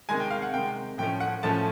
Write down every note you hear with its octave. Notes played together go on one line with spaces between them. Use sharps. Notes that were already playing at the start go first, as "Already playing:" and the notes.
C3 D#3 G#3 G#5
G5
F5
F#5
C3 D#3 G#3 G5
A2 F3 A3 C#4 G5
F#5
A2 F3 A3 C#4 A5